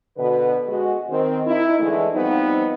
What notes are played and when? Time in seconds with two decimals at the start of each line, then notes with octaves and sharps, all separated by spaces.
0.17 B2 D3 B4
0.68 G#3 F#4
1.10 D#3 C4
1.46 D#4 E4
1.80 D3 E3 G#3 A3
2.13 F3 G3 B3 C4 D#4